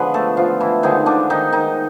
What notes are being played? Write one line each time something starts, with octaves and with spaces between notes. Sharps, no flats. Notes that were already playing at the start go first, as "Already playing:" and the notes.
Already playing: D3 F3 G#3 B3 B4
A3 A4
F3 F4
E3 E4
D3 D#3 F3 G#3 B3 D#4
D3 D4
D#3 D#4
D#3 D#4